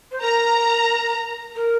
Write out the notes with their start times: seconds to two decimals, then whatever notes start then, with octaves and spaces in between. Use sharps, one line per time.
0.11 C5
0.22 A#4 A#5
1.56 A#4